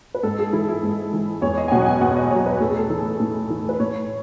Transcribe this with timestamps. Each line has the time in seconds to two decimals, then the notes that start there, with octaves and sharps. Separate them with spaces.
0.15 B4
0.23 G#2 A4
0.39 G#4
0.53 E3 E4
0.69 E4
0.83 G#2
1.13 E3
1.42 E2 C#5
1.57 D#5
1.68 G#5
1.71 B2 F#3 F#5
1.82 F#5
1.86 G#5
2.01 E2 F#5
2.17 D#5
2.31 B2 F#3 C#5
2.46 B4
2.60 A2 A4
2.70 G#4
2.79 A4
2.90 E3
3.20 A2
3.50 E3
3.69 B4
3.80 A2 C#5